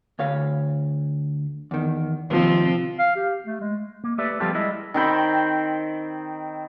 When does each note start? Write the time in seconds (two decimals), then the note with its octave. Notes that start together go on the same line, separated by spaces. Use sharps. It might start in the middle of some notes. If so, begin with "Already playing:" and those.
0.19 D2 C#5 F5
1.71 E2 D#3
2.30 D#2 C3 F3 C4
2.99 F5
3.16 G4
3.46 A3
3.61 G#3
4.04 A#3
4.18 A3 G4 B4 D5 E5
4.40 F3 G3 B3 F4 G4 A4
4.54 G3 G#3 E4 D#5 E5
4.94 D#3 C4 G5 B5